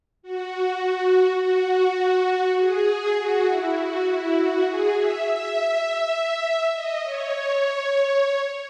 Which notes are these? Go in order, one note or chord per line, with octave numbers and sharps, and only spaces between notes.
F#4
F#4
G#4
F#4
E4
F#4
E4
F#4
G#4
E5
E5
D#5
C#5